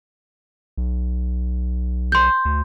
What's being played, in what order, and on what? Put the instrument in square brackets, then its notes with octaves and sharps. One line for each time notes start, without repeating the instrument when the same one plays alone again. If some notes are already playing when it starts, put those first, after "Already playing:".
[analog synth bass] B1
[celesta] C6 G6
[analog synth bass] D2